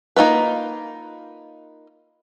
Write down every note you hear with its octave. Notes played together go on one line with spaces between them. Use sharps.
A#3 D#4 F4 B4